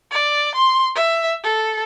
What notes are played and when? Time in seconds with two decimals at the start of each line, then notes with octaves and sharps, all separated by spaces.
0.11 D5
0.55 C6
0.95 E5
1.44 A4